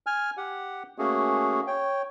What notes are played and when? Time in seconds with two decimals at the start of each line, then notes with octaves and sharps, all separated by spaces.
0.06 G#5 F6
0.37 G4 F#5
0.98 A3 A#3 C#4 F#4 G#4
1.67 C#5 G5